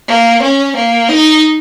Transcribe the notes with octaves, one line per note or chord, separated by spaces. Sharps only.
A#3
C#4
A#3
D#4